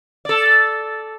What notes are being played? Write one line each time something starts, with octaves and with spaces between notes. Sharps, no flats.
A4 D5